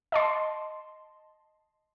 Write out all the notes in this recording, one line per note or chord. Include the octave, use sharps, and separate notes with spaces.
D#5 A5 C6